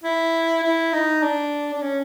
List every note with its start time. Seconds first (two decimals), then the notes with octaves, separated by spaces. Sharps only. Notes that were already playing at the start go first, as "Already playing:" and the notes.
0.04 E4
0.63 E4
0.93 D#4
1.23 D4
1.73 D4
1.82 C#4